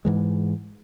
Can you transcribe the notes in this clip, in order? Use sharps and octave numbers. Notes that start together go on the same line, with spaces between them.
G#2 E3 G#3